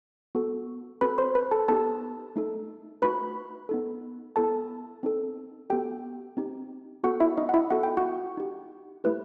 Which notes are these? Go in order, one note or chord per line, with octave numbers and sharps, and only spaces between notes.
B3 F#4 A4
C4 F#4 A4 B4 B5
C5 C6
B4 B5
A4 A5
B3 D#4 G4 A4 A5
A3 D#4 A4
A3 D#4 F#4 B4 B5
B3 D#4 A4
B3 E4 A4 A5
C4 D#4 A4
B3 F#4 G4 A4 G5
C4 D#4 G4
B3 F#4 A4 F#5
E4 E5
D#4 D#5
F#5
E4 E5
B3 F#4 A4 F#5
G5
F#4 F#5
D#4 G4
A3 E4 G4 B4